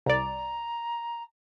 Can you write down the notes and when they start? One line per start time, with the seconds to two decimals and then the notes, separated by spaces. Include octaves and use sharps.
0.06 C2 D5 A#5